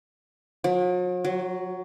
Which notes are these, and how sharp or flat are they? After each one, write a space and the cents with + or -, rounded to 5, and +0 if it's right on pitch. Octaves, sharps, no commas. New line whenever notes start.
F#3 -45
F#3 +10